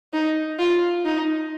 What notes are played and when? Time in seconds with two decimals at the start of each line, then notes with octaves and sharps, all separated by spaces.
0.13 D#4
0.59 F4
1.05 D#4